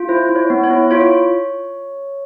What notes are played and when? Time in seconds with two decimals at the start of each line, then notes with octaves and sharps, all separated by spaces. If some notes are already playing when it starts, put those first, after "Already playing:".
Already playing: F4
0.09 E4 C5
0.29 E4
0.36 C#5
0.50 B3
0.64 C#5
0.71 E4
0.91 F4 C#5